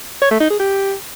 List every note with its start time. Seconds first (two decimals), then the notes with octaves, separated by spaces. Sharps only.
0.22 C#5
0.31 A3
0.41 D#4
0.50 G#4
0.60 G4